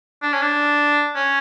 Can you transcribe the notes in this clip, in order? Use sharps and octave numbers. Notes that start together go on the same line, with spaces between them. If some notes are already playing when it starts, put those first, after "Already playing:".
D4
C#4
D4
C#4